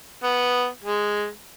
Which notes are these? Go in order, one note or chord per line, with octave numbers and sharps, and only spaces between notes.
B3
G#3